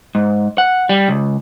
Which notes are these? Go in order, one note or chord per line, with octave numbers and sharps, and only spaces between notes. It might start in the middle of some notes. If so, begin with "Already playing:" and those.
G#2
F#5
G3
C#2